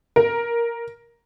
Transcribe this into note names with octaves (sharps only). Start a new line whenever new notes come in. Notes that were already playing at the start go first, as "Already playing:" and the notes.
A#4